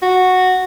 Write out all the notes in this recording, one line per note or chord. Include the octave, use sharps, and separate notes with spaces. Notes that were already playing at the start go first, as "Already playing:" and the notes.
F#4